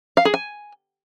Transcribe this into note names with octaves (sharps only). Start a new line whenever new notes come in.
F5
G#4
G#5